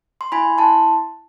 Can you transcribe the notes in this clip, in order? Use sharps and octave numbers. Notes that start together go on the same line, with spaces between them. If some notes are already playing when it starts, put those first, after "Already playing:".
C6
E4 G#5 B5
E4 A5 C6